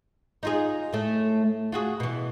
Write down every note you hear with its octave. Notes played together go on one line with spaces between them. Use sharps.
D#4 F4 G#4
A2 A3
F4 F#4 G#4
B2 E3